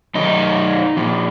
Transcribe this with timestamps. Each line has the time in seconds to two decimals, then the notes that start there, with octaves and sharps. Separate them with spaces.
0.15 F#2 D#3 D#4
0.97 A#2 F3